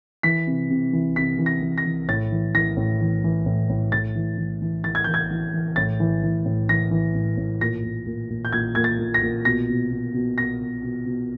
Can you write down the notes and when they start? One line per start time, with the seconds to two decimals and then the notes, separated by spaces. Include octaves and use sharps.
0.23 E3 B6
0.47 C3
0.70 C3
0.93 E3
1.16 C3 B6
1.39 E3
1.46 A#6
1.62 E3
1.78 A#6
1.85 E3
2.08 A2 A6
2.32 E3
2.55 E3 A#6
2.77 A2
3.01 E3
3.24 E3
3.46 A2
3.69 A2
3.92 A2 A6
4.15 E3
4.38 E3
4.62 E3
4.84 E3 A6
4.95 G#6
5.04 E3 G6
5.14 G#6
5.31 E3
5.54 E3
5.76 A2 A6
6.00 E3
6.23 E3
6.45 A2
6.69 E3 A#6
6.91 E3
7.15 A2
7.37 A2
7.61 A#2 A#6
7.84 A#2
8.06 A#2
8.30 A#2
8.45 G6
8.53 A#2 G#6
8.75 A#2 G#6
8.84 A6
8.99 A#2
9.14 A#6
9.22 A#2
9.45 B2 A#6
9.69 B2
9.91 B2
10.13 B2
10.38 B2 A#6
10.60 B2
10.83 B2
11.06 B2